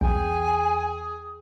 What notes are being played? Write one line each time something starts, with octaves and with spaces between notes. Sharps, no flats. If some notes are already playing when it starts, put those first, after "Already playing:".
B1 E2 G#4 G5 G#5